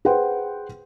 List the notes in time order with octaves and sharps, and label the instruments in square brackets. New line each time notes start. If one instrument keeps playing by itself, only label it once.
[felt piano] G#4 B4 C5 F#5 G5 C6